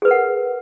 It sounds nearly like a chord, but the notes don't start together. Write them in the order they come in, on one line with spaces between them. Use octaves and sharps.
G#4 B4 A#4 F#5